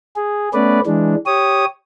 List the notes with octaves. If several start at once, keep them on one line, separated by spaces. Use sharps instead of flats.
G#4
A3 B3 C#4 B4 D5
E3 G#3 D4
G4 C#5 D#6